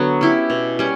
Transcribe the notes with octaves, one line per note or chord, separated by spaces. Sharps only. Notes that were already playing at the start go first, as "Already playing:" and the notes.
Already playing: D3 F#3 B3
C#4 E4 G4
B2
G3 C#4